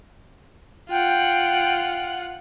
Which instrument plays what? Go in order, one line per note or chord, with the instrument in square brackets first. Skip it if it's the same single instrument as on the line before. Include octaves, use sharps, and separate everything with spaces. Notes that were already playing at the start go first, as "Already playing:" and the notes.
[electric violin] F4 F#5 [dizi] G5